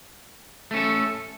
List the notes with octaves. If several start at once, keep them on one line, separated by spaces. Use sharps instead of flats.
A3 C#4 A4